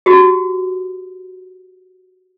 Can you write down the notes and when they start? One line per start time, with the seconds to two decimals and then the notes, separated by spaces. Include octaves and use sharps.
0.06 F#4 G4